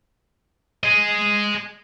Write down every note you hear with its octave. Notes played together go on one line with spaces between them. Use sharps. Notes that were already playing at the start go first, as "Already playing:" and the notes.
G#4 D#5